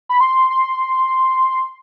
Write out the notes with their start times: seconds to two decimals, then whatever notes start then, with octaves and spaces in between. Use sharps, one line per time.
0.09 B5
0.21 C6
0.50 C6